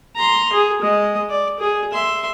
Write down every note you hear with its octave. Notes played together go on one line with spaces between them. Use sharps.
A#5 C6
G#4
G#3 D#5
D5
G#4
E5 C6